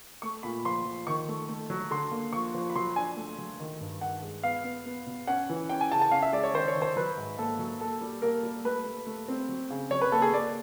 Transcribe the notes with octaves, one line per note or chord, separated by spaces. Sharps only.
A3 C#6
A#2 B5
F3 C6
F3
D#3 C#6
A3
A3
F#3
D3 C6
A#3
F3 C#6
F3
B5
F#3 C6
D4 G#5
A3
F#3
D#3
G2
D#3 F#5
G#3
B3 F5
B3
B3
B2
C#4 F#5
E3
C#4 G5
G#5
C#3 A5
A5
C#4 F5
E5
G#3 D5
C#5
D#3 C5
C#5
D#3
C5
F#3 B4
G#2
A#3 A4
F#3
A#3 A4
G3
A#3 A#4
G3
A3 B4
A3
A3
C4
F#3
C#3
F#3 C#5
B4
A#3 A4
G#4
A#3 D5